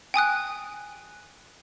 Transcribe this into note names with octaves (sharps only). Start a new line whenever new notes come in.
G5 G#5 D#6 F#6